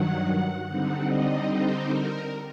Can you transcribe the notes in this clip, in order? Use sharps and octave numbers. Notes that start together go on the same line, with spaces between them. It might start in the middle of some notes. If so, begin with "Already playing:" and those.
Already playing: G2 D#3 F#3 F#5
D3 G3 C4 D#4 F#5
D#5
C5
A#4